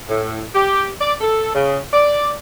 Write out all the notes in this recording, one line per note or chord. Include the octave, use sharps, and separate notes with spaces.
A2
G4
D5
A4
C#3
D5